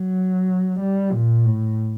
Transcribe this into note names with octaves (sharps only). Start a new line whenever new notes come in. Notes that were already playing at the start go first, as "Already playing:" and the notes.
Already playing: F#3
G3
A#2
A2